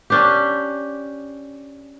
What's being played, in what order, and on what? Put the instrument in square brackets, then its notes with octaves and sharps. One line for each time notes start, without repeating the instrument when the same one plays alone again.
[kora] C#4 D4 G4